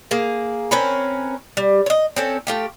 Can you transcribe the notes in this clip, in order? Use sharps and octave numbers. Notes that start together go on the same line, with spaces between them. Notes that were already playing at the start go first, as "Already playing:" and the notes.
A#3 G#4
C4 C#4 A#4 B4
G3
C#5 D#5
C4 C#4 A4
A3 F4 G4